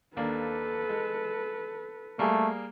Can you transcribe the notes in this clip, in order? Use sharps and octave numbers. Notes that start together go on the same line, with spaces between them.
D#2 A#3 D4 A4 B4
G#3
G3 A3 A#3 G#4